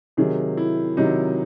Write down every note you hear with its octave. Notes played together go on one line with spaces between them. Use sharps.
C3 D#3 F#3 G#4
E4
C3 D#3 F#3 D#4